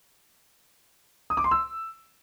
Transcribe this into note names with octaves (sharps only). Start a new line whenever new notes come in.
D#6
D6
C6
E6